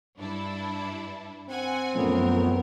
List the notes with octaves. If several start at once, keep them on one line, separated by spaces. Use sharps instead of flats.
G2 D4 E4
C4 F#5 G#5
F#2 A#2 F3 A3 B3 C#4 A#4